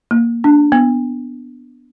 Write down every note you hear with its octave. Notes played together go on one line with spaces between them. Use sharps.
A#3
D4
B3